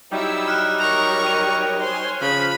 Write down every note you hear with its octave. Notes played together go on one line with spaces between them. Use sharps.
F#3 G3 D#4 E4 G4 E6
F6 F#6
G4 A#4 C#5 A#5 C#6 F#6
D#7 F7
C5 C#5 G#5 C6
C#3 F3 B5